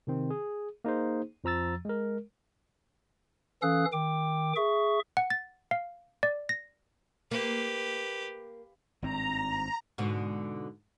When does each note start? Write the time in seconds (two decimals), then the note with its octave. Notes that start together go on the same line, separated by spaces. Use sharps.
0.07 C3 D#3 C4
0.30 G#4
0.84 A#3 D#4 G#4 C5
1.44 F2 F3 A#5 E6 A6
1.85 G#3 A#4
3.62 E3 C#4 A4 F5 D#6 F#6
3.93 D#3 G5 D6
4.56 G#4 E5 C#6
5.17 F#5
5.30 A6
5.71 F5
6.23 D5
6.49 A#6
7.31 A#3 G4 B4
9.02 G#1 G2 C4 A#5
9.98 G#2 B2 D3